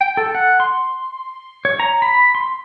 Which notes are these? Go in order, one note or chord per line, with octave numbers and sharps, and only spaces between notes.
G5
A4
F#5
C6
C#5
A#5
B5
C6